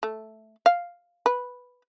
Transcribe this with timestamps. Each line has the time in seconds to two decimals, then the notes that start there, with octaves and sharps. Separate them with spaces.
0.03 A3
0.66 F5
1.26 B4